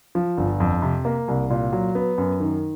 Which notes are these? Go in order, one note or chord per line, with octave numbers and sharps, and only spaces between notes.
F3
G1
F2
C3
A#3
C2
A#2
F#3
B3
F#2
D#3